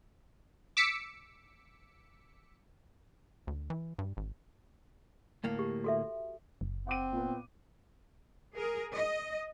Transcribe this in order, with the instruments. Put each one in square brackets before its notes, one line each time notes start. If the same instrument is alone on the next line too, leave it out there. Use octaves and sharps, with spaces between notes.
[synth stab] D6 E6 B6 C#7
[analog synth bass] D2
E3
G2
G#1
[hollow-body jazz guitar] D2 A2 A#3
[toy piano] G4
F#4 A4 E5
[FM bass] F#1
[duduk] C4 [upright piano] F#5 D6 D#7
[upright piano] A#2 B3
[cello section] G#4 A#4
D#5